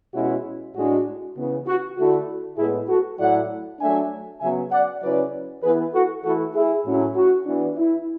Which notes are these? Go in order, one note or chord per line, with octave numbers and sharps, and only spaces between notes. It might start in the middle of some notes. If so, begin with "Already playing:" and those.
B2 G#3 C#4 E4 F#4
A2 G#3 D4 F#4
C#3 E3 B3
F#4
D3 A3 E4 F#4
A2 G#3 B3 E4 G#4
F#4 A4
A2 F#3 A3 E4 D5 F#5
F#3 A3 D4 E5 G#5
C#3 F#3 B3 E5 G#5
D5 F#5
C#3 F#3 C#4 E4 B4 D5
E3 B3 E4 G#4 B4
F#4 A4
E3 A3 E4 F#4 A4
E4 G#4
A2 F#3 C#4 E4
F#4
E3 B3 D4
E4